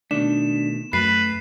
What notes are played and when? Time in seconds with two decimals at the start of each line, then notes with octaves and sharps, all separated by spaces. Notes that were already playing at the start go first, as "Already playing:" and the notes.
0.11 B2 D#3 A3 D4 E7
0.93 F#2 A3 B4 C7